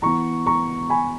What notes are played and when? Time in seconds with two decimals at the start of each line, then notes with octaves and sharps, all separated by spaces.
0.02 E3 B3 A#5 C#6
0.46 A#5 C#6
0.90 G#5 B5